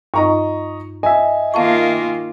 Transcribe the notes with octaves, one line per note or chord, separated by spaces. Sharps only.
G2 D#4 D#5 A#5 C#6
D#5 E5 G#5
D#3 A#3 F4 F5 A5 C#6